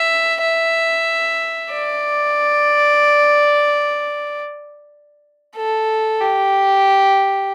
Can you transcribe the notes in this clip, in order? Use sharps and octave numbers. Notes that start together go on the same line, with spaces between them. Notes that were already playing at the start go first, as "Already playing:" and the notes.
Already playing: E5
E5
D5
A4
G4